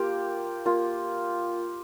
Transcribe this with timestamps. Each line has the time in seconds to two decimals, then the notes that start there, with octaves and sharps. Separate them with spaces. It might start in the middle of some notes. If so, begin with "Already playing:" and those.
Already playing: A#3 F4 G4
0.66 A#3 F4